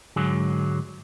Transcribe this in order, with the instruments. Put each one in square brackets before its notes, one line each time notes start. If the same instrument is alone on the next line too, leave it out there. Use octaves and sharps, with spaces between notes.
[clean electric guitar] G#2 D3 F#3 G#3